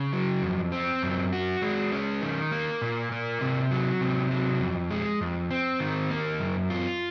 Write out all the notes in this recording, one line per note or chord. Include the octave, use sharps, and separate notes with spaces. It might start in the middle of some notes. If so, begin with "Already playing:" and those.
Already playing: C#3
F#3
F2
C4
F#2
F#4
G#3
C#4
D#3
A#3
A#2
A#3
C3
F#3
C3
F#3
F2
G#3
F2
C4
D#3
A#3
F#2
F4